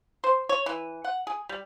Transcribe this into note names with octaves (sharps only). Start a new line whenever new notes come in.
C5
C#5
E3
F#5
G#4
G3